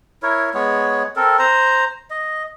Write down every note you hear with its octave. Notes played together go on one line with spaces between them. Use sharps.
E4 A#4 C#5
G#3 B3 C#5
C4 A4 A#4
C5 A#5
D#5